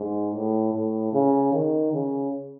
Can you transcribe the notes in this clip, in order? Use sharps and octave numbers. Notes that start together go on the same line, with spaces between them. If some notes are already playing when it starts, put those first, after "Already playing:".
Already playing: G#2
A2
A2
C#3
D#3
C#3